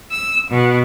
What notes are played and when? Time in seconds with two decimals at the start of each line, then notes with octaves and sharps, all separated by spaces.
0.10 E6
0.49 B2